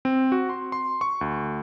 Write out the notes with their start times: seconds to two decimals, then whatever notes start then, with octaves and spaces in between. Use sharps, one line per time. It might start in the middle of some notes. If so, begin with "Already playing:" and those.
0.05 C4
0.32 F#4
0.49 C6
0.72 C6
1.01 C#6
1.21 D2